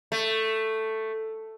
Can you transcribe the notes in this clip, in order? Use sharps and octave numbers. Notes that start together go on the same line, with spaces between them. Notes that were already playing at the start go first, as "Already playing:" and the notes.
A3